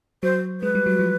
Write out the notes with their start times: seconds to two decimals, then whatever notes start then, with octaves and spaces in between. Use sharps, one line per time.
0.23 F#3 C5
0.61 G#3 B4
0.75 G3
0.86 F#3
0.99 F3